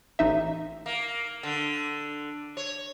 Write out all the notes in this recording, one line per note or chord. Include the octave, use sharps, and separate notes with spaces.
A1 D#4 E5
A#3
D3
C#5